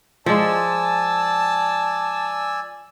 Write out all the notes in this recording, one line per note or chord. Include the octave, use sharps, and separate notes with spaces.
F3 G#3 D5 G#5 A5 E6